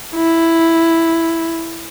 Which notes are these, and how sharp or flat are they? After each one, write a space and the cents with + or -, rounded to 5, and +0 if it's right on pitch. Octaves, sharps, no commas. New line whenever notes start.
E4 +0